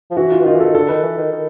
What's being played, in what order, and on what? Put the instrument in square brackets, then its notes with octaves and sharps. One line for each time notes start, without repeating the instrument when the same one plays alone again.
[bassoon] F3
[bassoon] E3 [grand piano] F#4
[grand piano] F4
[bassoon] E3
[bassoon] D#3 [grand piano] F4
[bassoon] E3
[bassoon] D#3 [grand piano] A4
[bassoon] D3 [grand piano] A4
[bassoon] D#3 [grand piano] B4
[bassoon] E3
D#3
D#3